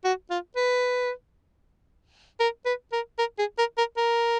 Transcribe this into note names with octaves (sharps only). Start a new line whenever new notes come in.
F#4
F4
B4
A#4
B4
A#4
A#4
G#4
A#4
A#4
A#4